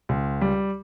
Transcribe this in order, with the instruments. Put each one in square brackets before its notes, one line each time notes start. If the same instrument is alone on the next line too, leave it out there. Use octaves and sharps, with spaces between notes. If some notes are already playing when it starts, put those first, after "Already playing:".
[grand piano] C#2
G3